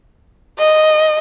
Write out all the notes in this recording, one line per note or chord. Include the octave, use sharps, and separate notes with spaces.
D#5